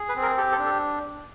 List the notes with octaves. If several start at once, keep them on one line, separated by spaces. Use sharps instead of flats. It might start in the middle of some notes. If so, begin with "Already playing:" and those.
Already playing: G#4
B4
C4
A#4
G4 A4
A4
D4
A4